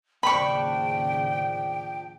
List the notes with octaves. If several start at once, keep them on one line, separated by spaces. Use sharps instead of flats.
D#2 A2 C#3 F3 D4 G5 B5 C#6